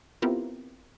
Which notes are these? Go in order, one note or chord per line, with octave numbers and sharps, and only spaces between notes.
B3 C4 E4 F4 G4 A#4